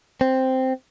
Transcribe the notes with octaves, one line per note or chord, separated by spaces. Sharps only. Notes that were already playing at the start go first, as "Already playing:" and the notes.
C4